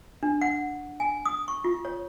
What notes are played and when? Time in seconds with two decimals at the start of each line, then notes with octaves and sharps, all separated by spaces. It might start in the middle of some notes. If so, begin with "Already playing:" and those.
0.23 D4
0.42 F#5
1.00 G#5
1.26 D#6
1.48 C#6
1.64 F4
1.85 C#5